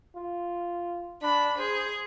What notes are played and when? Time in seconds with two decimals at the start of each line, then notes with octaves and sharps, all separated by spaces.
0.16 F4
1.22 D4 B5
1.59 G#4 C5